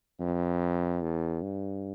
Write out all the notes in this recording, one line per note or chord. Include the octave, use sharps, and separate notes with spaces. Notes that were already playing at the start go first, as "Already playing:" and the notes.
F2
E2
G2